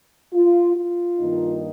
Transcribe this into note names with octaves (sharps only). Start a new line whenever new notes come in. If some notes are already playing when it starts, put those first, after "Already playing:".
F4
F4
G2 D#3 A#3 D#4